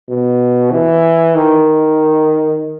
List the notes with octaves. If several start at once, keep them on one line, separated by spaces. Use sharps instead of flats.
B2
E3
D#3